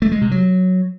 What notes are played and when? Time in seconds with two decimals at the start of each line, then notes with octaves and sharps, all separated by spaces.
0.02 A3
0.12 G#3
0.22 C3
0.31 F#3